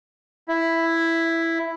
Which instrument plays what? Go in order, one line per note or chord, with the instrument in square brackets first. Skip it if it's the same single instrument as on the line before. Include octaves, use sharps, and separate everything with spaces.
[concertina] E4